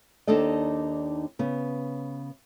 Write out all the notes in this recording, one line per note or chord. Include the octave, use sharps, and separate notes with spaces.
D#2 D4 D#4 A4 D5 D#5
C#3 B3